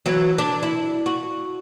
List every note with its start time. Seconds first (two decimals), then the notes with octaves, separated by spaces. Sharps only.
0.06 E3 F#3
0.38 D4
0.63 E4
1.06 F#4